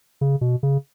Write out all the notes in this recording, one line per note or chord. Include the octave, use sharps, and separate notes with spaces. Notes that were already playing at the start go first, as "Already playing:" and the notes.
C#3
B2
C#3